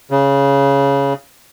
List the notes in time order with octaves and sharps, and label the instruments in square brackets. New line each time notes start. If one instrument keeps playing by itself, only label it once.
[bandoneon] C#3